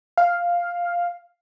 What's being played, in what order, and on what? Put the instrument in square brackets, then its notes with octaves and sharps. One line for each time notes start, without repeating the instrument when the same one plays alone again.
[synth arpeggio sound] F5